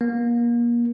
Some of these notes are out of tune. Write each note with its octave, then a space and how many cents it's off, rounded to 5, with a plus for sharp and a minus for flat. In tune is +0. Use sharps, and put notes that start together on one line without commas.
A#3 +30